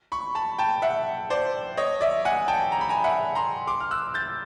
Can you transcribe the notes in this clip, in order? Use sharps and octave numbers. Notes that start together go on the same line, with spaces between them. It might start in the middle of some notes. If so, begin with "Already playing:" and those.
B5 C#6
A5 B5
G5 A5
E5 F#5
C5 D5
C#5 D#5
D5 E5
F#5 G#5
G5 A5
A#5
B5
G#5 A#5
E5 F#5
A#5 C6
C6 D6
F6
E6 F#6
G6 A6